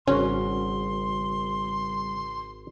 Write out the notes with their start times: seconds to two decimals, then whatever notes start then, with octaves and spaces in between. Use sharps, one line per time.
0.07 G#1 C#3 G3 C#4 F#4 C6